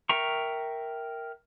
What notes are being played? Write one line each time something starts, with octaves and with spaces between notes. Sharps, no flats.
A#4 E5 G5 A#5 C#6